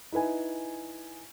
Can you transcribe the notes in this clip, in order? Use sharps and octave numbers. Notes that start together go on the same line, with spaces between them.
D#4 E4 B4 G#5